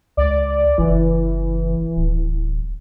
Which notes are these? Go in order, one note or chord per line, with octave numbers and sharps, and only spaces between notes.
C#2 D5
F#1 E3
D1